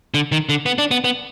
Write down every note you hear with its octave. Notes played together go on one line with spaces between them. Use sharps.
D3
D#3
D3
B3
D4
B3
B3